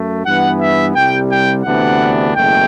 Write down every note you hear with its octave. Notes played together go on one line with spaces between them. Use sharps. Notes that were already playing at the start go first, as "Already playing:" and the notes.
Already playing: F#2 A3
G2 E3 B3 F#5
E5
C2 C3 G3 G5
G5
D2 C3 E3 B3 D4 F#5
F#1 E2 B2 A3 G5